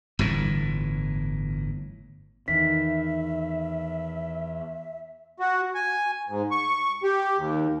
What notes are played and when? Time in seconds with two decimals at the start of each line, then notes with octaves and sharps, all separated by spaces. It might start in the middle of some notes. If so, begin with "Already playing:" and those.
0.19 G1 A2 E3
2.48 E2 D#3 E3 E5 B6
5.40 F#4
5.75 G#5
6.29 G#2
6.51 C#6
7.03 G4
7.37 D#2